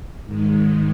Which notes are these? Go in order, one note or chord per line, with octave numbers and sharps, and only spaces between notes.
G#2 D#3 G#3